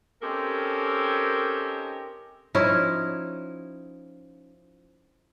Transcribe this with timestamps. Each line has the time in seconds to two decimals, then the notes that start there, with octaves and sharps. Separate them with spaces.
0.22 C4 C#4 D#4 G4 A4 A#4
2.55 F3 C#4 D#4 E4